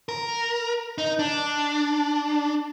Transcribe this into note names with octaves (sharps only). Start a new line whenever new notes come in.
A#4
D#4
D4